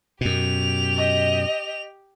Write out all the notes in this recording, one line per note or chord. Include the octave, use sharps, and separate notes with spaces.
F#2 B2 G4 F7
D#5